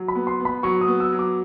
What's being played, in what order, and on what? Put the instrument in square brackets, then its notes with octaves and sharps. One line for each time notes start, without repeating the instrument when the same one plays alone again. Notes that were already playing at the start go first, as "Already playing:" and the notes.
Already playing: [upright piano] F#3
[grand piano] B5
[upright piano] B3
[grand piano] C6
[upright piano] B3
[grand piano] B5
[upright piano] F#3 [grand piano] C#6
[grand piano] D#6
[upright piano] B3
[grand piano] E6
[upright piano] F#3
[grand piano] D6